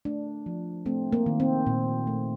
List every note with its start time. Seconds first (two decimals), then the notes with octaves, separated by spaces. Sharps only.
0.05 A3 D4
0.46 F3
0.86 A3 C4
1.13 A#3
1.26 D#3
1.40 C4
1.66 A#2
2.07 A3